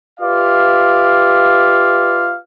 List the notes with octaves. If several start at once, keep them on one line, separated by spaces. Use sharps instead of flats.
F4 G4 B4 D5 E5 F5